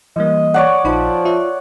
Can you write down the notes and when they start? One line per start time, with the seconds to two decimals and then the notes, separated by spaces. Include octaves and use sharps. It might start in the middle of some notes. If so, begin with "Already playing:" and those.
0.16 E3 G3 A#3 D#5
0.54 C#5 D5 F#5
0.84 A#1 F3 D#4 B5
1.25 F4 E5